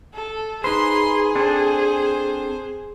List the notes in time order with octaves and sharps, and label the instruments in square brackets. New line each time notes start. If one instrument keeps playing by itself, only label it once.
[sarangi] A4
[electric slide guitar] D#4 B4 C5 [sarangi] G#4 [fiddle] C6
[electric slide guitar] C4 D4 A4 [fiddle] C5